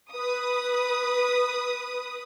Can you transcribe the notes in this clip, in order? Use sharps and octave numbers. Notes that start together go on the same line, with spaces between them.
B4 D#6